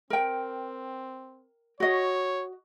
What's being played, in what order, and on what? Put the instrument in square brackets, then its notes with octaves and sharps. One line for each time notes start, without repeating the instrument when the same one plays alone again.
[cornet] C4 [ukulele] A#4 G5
[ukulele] F#4 D#5 [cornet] C#5